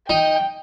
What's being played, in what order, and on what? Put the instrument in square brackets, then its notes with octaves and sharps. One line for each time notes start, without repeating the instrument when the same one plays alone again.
[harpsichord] D#4 D#5 [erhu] G5